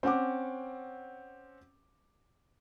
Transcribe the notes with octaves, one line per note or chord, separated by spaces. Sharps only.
C4 C#4 F#5 D6